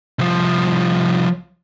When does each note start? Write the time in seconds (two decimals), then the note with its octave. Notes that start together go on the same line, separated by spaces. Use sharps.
0.19 C2 F3